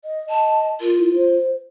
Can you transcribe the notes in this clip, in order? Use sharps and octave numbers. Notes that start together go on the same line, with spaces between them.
D#5
D#5 A5
F4 A#4
E4
C5